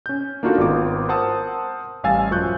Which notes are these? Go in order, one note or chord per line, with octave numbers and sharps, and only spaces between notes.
C#4 G6
A#3 D4 D#4 F4 F#4 A4
G#1 B3 F4 D6
A#4 C5 F#5 A5 D#6 E6
A1 G3 F5 G#5 E6 A6
F#2 F3 C#6 F#6 G6